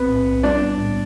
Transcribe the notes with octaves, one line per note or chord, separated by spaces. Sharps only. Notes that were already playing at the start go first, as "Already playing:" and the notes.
Already playing: B1 B3 C4 B4
A2
B1
G3 D4 D5
B3
A2